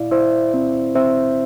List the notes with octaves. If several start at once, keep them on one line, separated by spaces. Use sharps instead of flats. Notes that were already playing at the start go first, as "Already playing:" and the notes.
Already playing: A#2 E4 D5 F5
E4 C5 E5
C4
C4 C5 E5